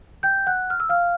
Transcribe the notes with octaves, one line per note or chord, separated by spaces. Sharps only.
G5 G6
F#5 F#6
F6
E6
F5 F6